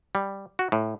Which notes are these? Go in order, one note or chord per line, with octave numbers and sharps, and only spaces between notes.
G3
F#4
A2